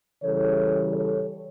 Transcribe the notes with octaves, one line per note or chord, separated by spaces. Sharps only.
C#3 E3 G3 A4 C#5
A4 C#5